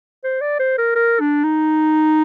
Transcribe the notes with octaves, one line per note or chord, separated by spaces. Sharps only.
C5
D5
C5
A#4
A#4
D4
D#4